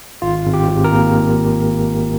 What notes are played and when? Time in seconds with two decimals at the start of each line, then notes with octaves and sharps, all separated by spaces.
0.22 G#1 F4
0.45 G#1
0.54 G4
0.68 G#1
0.84 A#4
0.92 A#3